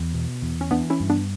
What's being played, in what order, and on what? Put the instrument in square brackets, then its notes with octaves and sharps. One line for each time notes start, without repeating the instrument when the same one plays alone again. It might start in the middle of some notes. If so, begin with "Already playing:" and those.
Already playing: [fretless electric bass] E2
B2
E2
[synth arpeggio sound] C#4
[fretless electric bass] E3 [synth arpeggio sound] B3 D4
[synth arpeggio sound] C#4 E4
[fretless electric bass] G2
[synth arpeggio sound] B3 D4